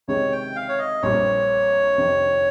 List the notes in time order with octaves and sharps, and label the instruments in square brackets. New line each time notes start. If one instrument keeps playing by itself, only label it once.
[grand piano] C#2 C3 D#3 G#3 [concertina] C#5
[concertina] G5
F5
C#5
D#5
[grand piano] A#1 A#2 G3 C4 [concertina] C#5
[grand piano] F2 C3 D#3